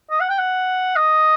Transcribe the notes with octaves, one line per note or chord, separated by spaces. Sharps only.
D#5
F#5
G5
F#5
D#5